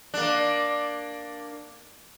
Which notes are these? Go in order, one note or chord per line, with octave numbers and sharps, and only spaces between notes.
A#3 D4